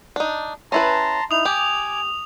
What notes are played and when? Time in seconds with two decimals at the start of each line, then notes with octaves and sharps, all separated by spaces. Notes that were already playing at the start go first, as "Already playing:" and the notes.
0.16 D4 D#4
0.72 C#4 E4 B4 A5 A#5 C6
1.31 D#4 E4 D#6 F7
1.45 G4 G#5 D6